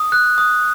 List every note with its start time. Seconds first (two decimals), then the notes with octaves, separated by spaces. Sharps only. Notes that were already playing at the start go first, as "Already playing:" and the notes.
Already playing: D#6
0.12 F#6
0.38 D#6